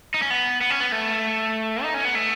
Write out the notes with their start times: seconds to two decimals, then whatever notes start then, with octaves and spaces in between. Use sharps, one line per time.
0.14 D#4
0.22 C#4
0.30 B3
0.61 B3
0.70 C#4
0.80 B3
0.92 A3
1.83 D#4
1.94 C#4
2.05 B3
2.15 A3